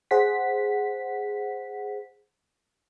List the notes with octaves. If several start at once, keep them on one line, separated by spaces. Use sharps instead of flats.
G#4 C5 F#5 B6